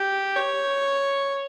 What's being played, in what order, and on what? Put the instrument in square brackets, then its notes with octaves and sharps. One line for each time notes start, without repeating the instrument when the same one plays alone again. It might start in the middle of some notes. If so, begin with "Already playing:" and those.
Already playing: [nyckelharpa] G4
C#5